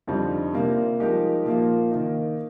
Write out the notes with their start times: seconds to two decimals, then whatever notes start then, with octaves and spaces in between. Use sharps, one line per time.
0.07 F2 D3 G3 C4 D#4
0.54 C3 G3 A#3 F4
1.00 F3 G#3 D#4 G4 A#4
1.45 A#2 F3 A#3 F4
1.90 D#3 A#3 D#4